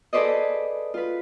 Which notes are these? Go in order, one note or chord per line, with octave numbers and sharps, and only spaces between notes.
G#4 A4 B4 C5 D5 D#5
F4 B4